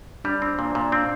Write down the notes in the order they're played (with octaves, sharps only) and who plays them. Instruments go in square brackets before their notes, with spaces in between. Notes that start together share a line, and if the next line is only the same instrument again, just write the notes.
[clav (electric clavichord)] G3 [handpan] D4
[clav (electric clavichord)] C4
A#2
A#2
[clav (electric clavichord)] C4 [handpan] D4